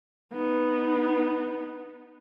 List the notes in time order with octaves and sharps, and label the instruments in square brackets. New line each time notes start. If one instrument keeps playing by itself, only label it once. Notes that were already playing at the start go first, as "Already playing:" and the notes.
[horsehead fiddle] B3 D#4